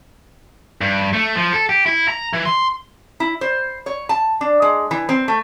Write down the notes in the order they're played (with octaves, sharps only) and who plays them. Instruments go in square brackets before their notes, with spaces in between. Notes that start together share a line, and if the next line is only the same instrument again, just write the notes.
[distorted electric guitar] G2
A3
F3
A4
G4
E4
A#5
E3
C6
[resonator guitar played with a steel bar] E4
C5
C#5
A5
D4
G#3
E3
C4
A3